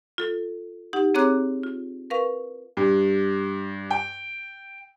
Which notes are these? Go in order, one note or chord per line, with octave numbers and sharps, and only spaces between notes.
F4 A4
D#4 G4 F#5
C4 G#4 C#5 A#5 D6 F#6
F4
A#4 B4 F5 C#6
G2
G5